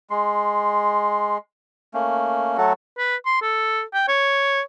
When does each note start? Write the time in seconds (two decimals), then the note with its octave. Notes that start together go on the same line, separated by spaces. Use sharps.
0.10 G#3 C6
1.94 A3 A#3 C#4
2.58 F#3 A3 F#4 A4
2.98 B4
3.26 C6
3.42 A4
3.94 G5
4.08 C#5